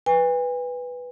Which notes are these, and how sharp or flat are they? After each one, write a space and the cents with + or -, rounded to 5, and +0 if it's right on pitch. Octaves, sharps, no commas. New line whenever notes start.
B4 +0 G#5 -45